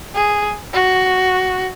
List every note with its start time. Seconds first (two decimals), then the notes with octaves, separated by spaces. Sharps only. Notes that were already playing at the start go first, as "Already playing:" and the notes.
0.15 G#4
0.73 F#4